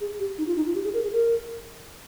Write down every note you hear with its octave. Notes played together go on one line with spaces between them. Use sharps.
G#4
G4
D#4
F4
D#4
F4
G4
G#4
A#4
G#4
A#4